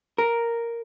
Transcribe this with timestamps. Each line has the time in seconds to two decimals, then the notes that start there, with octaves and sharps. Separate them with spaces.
0.18 A#4